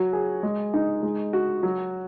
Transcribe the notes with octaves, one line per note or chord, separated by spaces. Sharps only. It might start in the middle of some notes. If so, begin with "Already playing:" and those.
Already playing: F#3 F#4
G#4
G#3
D#4
G#3
F#4
F#3